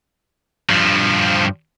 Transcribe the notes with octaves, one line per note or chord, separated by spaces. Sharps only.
G2 F3